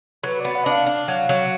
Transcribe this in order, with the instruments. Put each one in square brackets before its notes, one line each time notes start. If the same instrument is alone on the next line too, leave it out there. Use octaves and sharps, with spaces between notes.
[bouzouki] F#3 [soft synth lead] B4
[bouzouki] B3 [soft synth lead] D5
[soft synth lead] F#5
[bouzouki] D4 [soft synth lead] D#5
[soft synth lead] F5
[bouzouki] D4
F#3
F#3